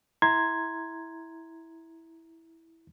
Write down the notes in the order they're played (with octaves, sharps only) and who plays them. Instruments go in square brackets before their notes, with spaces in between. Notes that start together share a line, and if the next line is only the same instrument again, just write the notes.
[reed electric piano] E4 A#5 C6 G#6